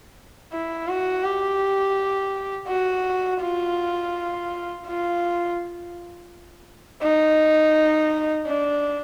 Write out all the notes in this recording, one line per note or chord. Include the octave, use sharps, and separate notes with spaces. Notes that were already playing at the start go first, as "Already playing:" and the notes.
E4
F#4
G4
F#4
F4
F4
D#4
D4